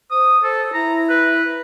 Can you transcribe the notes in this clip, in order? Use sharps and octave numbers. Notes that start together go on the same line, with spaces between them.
C5 D#6
A4 C5
E4 A#5
B4